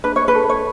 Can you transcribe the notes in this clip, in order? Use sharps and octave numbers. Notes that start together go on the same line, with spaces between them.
D4 B4
C#5
B4
A4
C#5